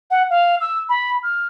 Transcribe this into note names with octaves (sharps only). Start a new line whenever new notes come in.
F#5
F5
E6
B5
F6